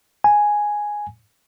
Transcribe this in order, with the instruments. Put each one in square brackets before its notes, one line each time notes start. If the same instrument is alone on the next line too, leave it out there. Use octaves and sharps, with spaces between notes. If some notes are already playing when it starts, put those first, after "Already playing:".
[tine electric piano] G#5